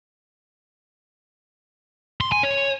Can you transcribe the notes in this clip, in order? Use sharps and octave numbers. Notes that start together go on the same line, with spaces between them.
C6
G#5
C#5